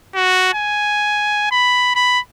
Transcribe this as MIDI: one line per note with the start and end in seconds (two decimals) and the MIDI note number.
0.15 0.53 66
0.54 1.46 80
1.51 1.94 83
1.96 2.19 83